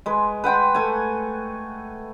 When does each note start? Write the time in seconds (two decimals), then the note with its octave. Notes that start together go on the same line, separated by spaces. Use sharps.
0.06 G#3 B4
0.44 B4 F#5 G5 C6
0.75 A3 G#5